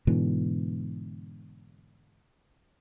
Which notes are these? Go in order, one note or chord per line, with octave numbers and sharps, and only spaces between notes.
G#2 B2 D3 E3